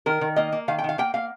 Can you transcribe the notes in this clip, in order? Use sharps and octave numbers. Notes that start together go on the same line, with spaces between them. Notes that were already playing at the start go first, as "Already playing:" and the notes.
D#3 A#4
D#3
A#3 D#5
A#3
D#3 F5
G5
D#3 F5
A#3 G5
A#3 F5